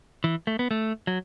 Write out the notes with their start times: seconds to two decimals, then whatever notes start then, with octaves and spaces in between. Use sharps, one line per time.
0.24 E3
0.47 A3
0.59 B3
0.71 A3
1.07 F#3